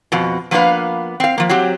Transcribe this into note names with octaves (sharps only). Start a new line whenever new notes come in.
F2 B2
F3 A#3 B3 D4 B4 F5
C4 F5
F3 A#3
F#3 C4 G4